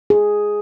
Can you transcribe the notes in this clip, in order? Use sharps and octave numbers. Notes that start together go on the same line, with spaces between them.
G#4